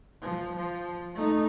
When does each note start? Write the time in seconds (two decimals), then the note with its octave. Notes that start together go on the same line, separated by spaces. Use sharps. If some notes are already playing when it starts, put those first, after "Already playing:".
0.22 F3
0.56 F3
1.15 A3 D#4